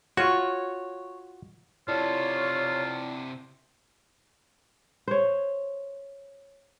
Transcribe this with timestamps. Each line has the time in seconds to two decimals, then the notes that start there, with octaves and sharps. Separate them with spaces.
0.17 F4 F#4 C#5
1.88 C3 E4 F4 A4 C#5 D5 A5
5.08 C5 C#5